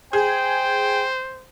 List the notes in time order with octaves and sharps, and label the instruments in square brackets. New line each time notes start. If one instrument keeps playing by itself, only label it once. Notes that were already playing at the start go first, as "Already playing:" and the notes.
[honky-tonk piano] G#4 [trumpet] C5 [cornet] G5